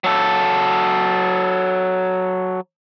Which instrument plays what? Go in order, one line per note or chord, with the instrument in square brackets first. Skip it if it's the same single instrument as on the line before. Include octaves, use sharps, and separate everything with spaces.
[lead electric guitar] F#3 A4